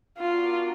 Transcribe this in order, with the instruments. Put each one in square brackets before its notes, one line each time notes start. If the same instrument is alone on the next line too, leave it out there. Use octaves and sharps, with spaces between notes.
[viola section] B3 D4 F#4 A#4 D5 [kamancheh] F4